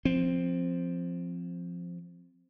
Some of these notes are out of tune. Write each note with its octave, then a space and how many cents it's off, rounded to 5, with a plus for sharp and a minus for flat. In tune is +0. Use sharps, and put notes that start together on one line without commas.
F3 +0 C4 +0